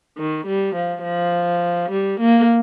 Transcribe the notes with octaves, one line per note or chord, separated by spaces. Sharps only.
D#3
G3
F3
F3
G3
A#3